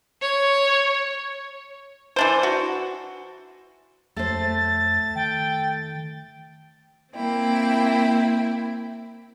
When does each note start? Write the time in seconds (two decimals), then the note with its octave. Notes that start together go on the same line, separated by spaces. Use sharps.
0.22 C#5
2.16 E3 D4 C5
2.43 F#4
4.16 F2 A3 C5 A6
5.15 D#3 G5
7.15 A#3 C4 E4 G5